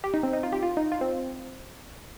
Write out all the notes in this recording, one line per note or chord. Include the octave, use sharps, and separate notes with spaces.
G4
D#4
C4
D#4
F4
G4
F4
D#4
F4
C4